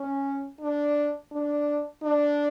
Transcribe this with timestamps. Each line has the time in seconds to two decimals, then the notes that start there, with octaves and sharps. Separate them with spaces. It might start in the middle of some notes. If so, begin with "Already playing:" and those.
Already playing: C#4
0.61 D4
1.32 D4
2.03 D4